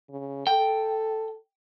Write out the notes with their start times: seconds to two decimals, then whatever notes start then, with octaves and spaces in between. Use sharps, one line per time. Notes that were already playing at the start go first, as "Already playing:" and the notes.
0.10 C#3
0.47 A4 G5